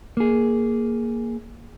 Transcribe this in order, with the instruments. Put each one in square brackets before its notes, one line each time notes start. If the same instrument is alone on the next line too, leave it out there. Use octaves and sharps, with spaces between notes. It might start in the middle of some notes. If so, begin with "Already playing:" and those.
[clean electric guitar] A#3 G#4